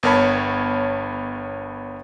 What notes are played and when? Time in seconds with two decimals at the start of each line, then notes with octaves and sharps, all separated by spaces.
0.03 G1 B3 A#4 C#5 A5 B5